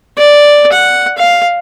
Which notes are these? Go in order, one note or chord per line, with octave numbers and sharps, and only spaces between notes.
D5
F#5
F5